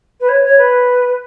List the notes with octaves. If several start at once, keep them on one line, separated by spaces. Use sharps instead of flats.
B4
C#5
C#5
B4